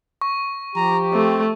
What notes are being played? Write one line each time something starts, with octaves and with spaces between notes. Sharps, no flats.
C#6
F3 G4 A#5
A3 C4